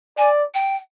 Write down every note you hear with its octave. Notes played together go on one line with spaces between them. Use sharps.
D5 G#5
G5